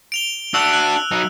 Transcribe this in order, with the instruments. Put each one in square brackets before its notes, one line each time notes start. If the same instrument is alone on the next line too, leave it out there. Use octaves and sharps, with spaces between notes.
[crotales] D7 F7 G7
[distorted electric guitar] D4 F#4 [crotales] E6 F7
[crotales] F#6
[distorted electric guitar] F#3 D#4